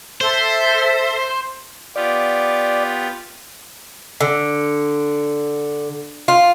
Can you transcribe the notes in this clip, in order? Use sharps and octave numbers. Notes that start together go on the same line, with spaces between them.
A4 C5 E5 C6
B3 F4 G4 D5
D3
F4